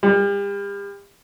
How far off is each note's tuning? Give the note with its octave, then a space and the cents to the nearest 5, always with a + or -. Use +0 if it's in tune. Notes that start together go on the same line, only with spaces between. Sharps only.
G3 +40